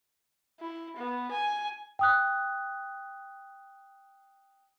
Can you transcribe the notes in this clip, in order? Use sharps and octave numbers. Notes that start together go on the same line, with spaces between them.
E4
B3
G#5
G5 D#6 F#6